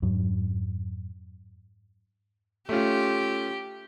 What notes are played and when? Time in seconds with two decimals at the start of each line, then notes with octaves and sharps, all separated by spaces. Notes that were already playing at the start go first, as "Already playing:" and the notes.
0.02 F2 G#2 F#3
2.69 A3 C#4 F4 G4